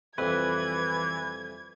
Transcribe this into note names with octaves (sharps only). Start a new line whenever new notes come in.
C2 F2 E3 B4 G#6